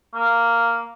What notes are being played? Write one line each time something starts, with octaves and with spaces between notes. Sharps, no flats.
A#3